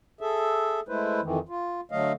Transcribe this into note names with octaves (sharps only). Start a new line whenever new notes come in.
G#4 A4 E5
G#3 A3 E4 B4 C5
F2 D#3 E3
F4
D3 F#3 A3 D#5 F5